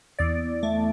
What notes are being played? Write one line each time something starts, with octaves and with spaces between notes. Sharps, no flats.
E2 D5
A3